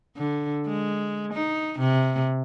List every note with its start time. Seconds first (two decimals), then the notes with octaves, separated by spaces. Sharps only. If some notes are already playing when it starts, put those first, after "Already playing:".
0.17 D3
0.67 G#3
1.33 D#4
1.79 C3